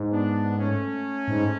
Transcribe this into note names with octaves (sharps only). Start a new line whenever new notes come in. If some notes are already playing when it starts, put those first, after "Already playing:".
Already playing: G#2
B3 D4
A3 C#4
G#2